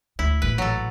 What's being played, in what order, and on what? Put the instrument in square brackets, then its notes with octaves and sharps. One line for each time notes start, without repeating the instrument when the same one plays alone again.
[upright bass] D2 [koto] E4
[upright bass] A1 A#2 [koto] B4
[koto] F#3 A4